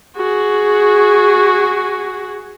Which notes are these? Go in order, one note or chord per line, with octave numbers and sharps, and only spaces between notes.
F#4 G#4